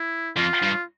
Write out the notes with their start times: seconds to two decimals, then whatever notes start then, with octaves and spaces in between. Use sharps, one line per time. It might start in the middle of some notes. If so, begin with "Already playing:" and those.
Already playing: E4
0.36 F2 F4
0.62 G2